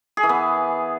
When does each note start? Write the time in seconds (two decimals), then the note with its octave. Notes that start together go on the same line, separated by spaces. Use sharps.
0.17 G#4
0.23 E3
0.29 B3